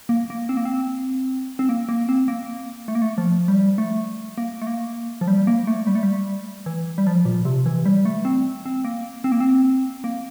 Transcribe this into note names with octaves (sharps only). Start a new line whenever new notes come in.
A#3
A#3
C4
A#3
C4
C4
A#3
A#3
C4
A#3
A3
A#3
A3
F3
G3
A3
A#3
A3
A#3
F3
G3
A#3
A3
G3
A3
G3
E3
G3
F3
A#2
C3
E3
G3
A3
C4
C4
A#3
C4
A#3
C4
A#3